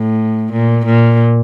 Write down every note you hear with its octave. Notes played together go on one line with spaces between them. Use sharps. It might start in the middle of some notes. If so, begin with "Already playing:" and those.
Already playing: A2
A#2
A#2